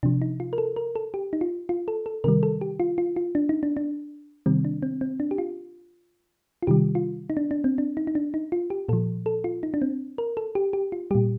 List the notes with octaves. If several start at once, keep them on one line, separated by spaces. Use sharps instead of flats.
C3 F3 D4
D#4
F4
A#4
A4
A#4
A4
G4
D#4
F4
F4
A4
A4
C3 D#3 G3 A#4
A4
G4
F4
F4
F4
D4
D#4
D4
D4
C3 D#3 G3 C4
D4
C4
C4
D4
G4
F4
F4
C3 D#3 G3 G4
F4
D#4
D4
D4
C4
D4
D#4
D#4
D4
D#4
F4
G4
A#2 F3 A4
A4
F4
D#4
D4
C4
A#4
A4
G4
G4
F4
A#2 G3 G4